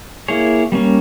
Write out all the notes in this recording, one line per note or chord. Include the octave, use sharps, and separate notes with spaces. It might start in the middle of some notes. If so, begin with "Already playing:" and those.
A#3 E4 G#4 C#5
G3 A#3 C#4